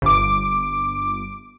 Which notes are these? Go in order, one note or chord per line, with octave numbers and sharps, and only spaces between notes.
G1 D6